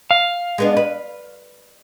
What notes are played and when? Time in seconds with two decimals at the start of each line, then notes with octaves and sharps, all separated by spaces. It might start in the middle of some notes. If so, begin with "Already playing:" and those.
0.11 F5
0.58 G#3 B3 D4
0.77 B4